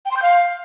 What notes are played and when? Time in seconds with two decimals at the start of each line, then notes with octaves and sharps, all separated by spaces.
0.05 G5
0.11 C6
0.16 G6
0.22 F5